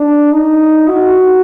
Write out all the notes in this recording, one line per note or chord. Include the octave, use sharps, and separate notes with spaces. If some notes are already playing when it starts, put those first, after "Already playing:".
Already playing: D4
D#4
F#4